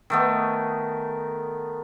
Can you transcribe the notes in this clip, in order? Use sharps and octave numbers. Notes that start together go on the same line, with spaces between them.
D#3 A3 B3